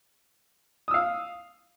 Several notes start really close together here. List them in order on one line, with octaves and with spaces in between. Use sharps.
D#6 E6 F5